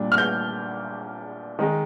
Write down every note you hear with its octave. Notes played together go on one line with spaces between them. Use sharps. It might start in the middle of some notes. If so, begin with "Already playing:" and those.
Already playing: A#2 G3 D4
F6
G6
D#3 G#3 D#4